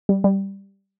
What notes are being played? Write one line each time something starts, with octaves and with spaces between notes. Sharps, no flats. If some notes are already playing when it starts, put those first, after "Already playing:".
G3
G3